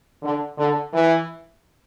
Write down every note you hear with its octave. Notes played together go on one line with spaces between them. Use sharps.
D3
D3
E3